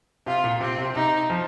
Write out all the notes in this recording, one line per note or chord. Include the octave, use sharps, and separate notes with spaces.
C3 F4
A#2
C3 C4
C3
C3 D#4
F3